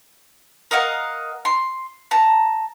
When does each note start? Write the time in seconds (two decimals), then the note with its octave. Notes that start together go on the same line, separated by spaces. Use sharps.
0.71 A#4 D#5 F5 F#5
1.45 C6
2.11 A5 A#5